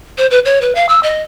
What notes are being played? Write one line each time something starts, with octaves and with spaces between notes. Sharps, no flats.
C5
B4
C#5
B4
F5
E6
D#5